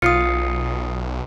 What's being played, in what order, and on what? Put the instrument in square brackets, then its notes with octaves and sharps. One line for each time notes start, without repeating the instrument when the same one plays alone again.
[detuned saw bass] B1 [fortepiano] F4 [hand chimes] D#6 C7 C#7